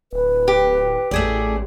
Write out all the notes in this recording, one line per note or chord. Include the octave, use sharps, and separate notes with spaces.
D1 B4
G4
A1 A3 G#4 D5